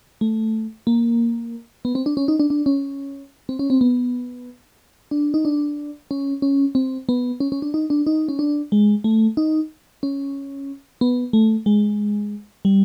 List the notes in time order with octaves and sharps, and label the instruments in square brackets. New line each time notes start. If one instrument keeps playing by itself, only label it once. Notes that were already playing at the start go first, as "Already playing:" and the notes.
[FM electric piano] A3
A#3
B3
C4
D4
C#4
D#4
D4
D4
C#4
C4
C#4
C4
B3
D4
D#4
D4
C#4
C#4
C4
B3
C#4
C#4
D4
D#4
D4
D#4
C#4
D4
G#3
A3
D#4
C#4
B3
A3
G#3
G3